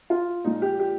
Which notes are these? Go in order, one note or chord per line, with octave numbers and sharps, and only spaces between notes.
F4
A#2 F3 G#3 D#4
G4
G4